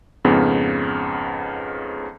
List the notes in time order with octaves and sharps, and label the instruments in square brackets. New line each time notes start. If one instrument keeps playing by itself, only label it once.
[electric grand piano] F2 G#2 C#3 B3